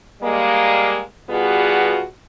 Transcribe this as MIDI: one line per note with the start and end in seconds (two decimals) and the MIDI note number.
0.22 1.00 55
0.22 1.00 56
0.22 1.00 58
1.30 2.03 47
1.30 2.03 55
1.30 2.03 59
1.30 2.03 65
1.30 2.03 66
1.30 2.03 68